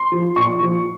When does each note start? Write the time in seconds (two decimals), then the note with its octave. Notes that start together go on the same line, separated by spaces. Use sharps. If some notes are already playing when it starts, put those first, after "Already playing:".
Already playing: C6
0.12 F3
0.36 A#2 C#6
0.61 F3